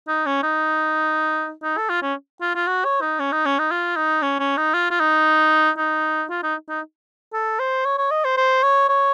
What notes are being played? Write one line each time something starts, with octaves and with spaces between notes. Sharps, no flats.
D#4
C#4
D#4
D#4
A4
F4
C#4
F4
F4
F#4
C#5
D#4
C#4
D#4
C#4
D#4
F4
D#4
C#4
C#4
D#4
F4
F4
D#4
D#4
F4
D#4
D#4
A4
C5
C#5
C#5
D#5
C5
C5
C#5
C#5